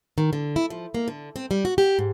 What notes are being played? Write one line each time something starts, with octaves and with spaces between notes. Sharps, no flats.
D#3
D3
E4
F3
A#3
D3
C4
G3
F#4
G4
G#2